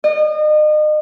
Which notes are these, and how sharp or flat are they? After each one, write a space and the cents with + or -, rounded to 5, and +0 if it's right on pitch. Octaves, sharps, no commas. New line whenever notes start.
D#5 -35